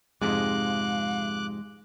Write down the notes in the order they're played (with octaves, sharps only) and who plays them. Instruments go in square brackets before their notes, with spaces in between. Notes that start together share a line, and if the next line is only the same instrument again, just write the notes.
[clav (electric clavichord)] F2 G#2 C3 [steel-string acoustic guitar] G#3 [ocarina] F5 [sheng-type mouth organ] D6 F#6